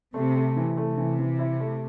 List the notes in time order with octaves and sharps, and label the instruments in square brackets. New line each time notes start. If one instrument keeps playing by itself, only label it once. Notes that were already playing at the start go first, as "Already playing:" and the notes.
[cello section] C3 [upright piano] A3
[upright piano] A3
E3
[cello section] C3 [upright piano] A3
[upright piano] E3
E3
E4
A3